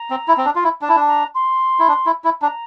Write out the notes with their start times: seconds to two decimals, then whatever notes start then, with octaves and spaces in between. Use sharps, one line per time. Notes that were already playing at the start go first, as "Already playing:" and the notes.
Already playing: A#5
0.10 C4
0.28 E4
0.37 C4
0.45 D4
0.55 F4
0.64 E4
0.81 D4 A5
0.89 E4
0.96 D4
1.08 A#5
1.34 C6
1.79 E4
1.88 D4
2.06 E4
2.24 E4
2.41 D4 A#5